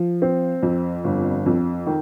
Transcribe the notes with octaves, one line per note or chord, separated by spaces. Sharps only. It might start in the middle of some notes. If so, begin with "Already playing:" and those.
Already playing: F3
C4
F2
G1
F2
D#3